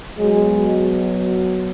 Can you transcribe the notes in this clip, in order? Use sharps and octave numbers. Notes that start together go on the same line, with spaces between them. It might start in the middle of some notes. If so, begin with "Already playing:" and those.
B2 F#3 G#3